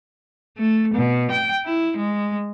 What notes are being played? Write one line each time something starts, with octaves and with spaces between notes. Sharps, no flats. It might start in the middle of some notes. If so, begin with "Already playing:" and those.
A3
B2
G5
E4
G#3